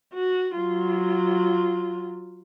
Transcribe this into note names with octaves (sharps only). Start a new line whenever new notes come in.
F#4
F#3 F4